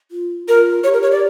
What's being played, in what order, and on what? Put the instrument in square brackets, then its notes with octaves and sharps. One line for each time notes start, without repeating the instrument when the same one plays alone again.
[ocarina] F4
[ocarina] F4 [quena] A#4
[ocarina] G4 [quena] C#5
[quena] A#4
C#5
D5